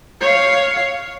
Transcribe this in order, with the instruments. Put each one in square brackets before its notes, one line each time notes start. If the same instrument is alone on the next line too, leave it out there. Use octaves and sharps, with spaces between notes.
[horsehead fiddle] C#5 F5